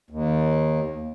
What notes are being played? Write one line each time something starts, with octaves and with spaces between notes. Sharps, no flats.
D#2